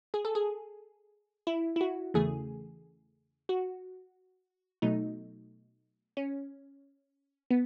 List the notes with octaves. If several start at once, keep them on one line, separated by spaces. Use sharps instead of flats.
G#4
A4
G#4
E4
E4
F#4
E2 C#3 E3 A3 G#4
F#4
B2 F#3 A3 D#4
C#4
B3